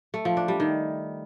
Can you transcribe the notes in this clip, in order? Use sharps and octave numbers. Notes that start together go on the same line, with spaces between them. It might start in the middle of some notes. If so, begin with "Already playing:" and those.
A3
F3
D4
G3
D#3